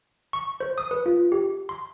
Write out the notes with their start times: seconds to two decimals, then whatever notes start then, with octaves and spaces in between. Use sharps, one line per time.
0.33 C#6
0.60 C5
0.78 D#6
0.91 B4
1.06 F4
1.32 G4
1.69 C6